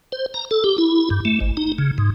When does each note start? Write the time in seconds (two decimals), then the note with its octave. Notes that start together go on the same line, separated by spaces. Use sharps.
0.12 C5
0.34 A#5
0.51 A4
0.64 G4
0.78 E4
1.10 G2
1.25 A3
1.40 G#1
1.57 D#4
1.78 C#3
1.98 G#2